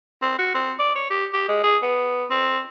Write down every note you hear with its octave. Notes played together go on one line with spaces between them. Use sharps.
C4
F#4
C4
D5
C#5
G4
G4
G#3
G#4
B3
C4